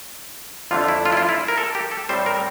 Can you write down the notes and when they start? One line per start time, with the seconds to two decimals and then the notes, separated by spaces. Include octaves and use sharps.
0.71 F2 D3 A3 F4
0.88 E4
1.06 F4
1.12 E4
1.17 F4
1.29 E4
1.48 A#4
1.58 A4
1.75 G4
1.92 A4
2.09 A2 G3 C4 C5
2.26 A#4